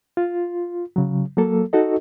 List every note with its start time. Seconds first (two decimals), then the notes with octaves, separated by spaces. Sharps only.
0.17 F4
0.96 C#3 F#3
1.37 F#3 A#3 A4
1.73 D#4 F#4 A4 D#5